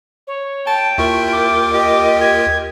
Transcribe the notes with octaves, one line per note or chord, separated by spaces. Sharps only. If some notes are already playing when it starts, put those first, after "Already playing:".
C#5
G5 A5
D#2 E4 F4 A#4 C#6
D6
G4 D#5
G4 G#6